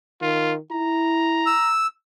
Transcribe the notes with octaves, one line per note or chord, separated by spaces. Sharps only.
D#3 F4
E4 A#5
E6